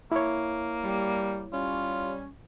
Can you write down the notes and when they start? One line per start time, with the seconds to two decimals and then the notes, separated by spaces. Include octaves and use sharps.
0.12 A#3 E4 C#5
0.84 G3
1.53 G3 C#4 F4